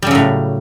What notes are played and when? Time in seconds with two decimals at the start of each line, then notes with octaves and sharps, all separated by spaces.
0.02 G3
0.07 C#3
0.11 F#3
0.15 A2